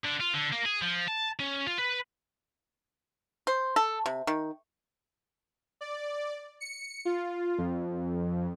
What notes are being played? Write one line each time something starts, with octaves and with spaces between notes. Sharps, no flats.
D3
F4
D3
A#3
G#4
F3
A5
C#4
F4
B4
C5
A4
C3
D#3
D5
C#7
F4
F2